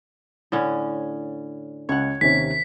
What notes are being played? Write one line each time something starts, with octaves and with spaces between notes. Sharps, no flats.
A2 D3 C#4
C#2 C#5 F#5
D#2 C3 C#4 B6